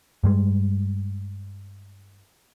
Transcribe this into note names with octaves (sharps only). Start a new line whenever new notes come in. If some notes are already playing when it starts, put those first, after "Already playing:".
G2 G3 G#3